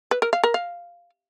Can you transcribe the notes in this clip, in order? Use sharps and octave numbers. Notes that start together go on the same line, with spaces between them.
B4
A#4
F5
A#4
F5